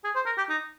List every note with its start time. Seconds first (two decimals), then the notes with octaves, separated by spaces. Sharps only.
0.04 G#4
0.15 C5
0.26 A#4
0.37 G4
0.49 D#4